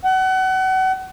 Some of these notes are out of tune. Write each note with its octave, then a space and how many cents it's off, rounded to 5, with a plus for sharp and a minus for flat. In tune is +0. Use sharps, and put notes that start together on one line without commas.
F#5 +30